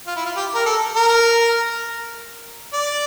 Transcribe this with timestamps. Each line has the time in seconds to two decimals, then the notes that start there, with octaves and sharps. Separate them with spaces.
0.07 F4
0.16 E4
0.26 F4
0.36 G4
0.55 A#4
0.66 A4
0.96 A#4
2.73 D5